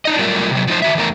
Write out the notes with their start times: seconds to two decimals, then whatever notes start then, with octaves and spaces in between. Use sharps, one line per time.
0.05 D4 D#4 D#5
0.19 F#3 G3 A3 A#3 F4 A#4
0.51 C3 F#3
0.67 F3 D#4 C5
0.82 D#3 F#4 E5
0.95 E2 A3 A#4